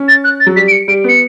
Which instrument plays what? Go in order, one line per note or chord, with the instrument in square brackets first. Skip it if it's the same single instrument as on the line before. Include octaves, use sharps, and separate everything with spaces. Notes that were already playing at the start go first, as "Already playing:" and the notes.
Already playing: [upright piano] C#4
[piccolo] A6
F#6
A6
[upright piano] F#3
[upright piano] G3 [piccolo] B6
[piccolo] D7
C#7
[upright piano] G3 [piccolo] D7
[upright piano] B3 [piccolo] C#7